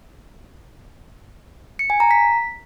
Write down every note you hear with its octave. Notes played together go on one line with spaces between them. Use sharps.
C#7
G#5
A#5
B6